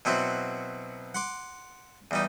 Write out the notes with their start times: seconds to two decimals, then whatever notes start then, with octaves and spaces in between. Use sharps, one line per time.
0.05 B2 F#3 C4 E4 F#4
1.14 F#5 C6 D6
2.11 E2 G3 D#4